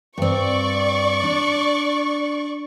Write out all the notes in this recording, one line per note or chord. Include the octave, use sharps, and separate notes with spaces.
G2 C4 D5 C#6
D4